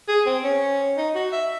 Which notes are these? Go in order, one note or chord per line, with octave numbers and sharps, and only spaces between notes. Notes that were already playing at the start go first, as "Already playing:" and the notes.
G#4
C4
C#4
D#4
F#4
E5